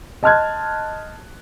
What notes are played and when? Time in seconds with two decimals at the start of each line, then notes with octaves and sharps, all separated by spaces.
0.23 D#5 A5 C6 F6 F#6 G#6